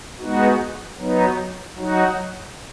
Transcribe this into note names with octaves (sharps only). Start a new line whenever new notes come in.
G#3 B3 D#4 F#4
F#3 B3 D#4
F#3 D#4 F#4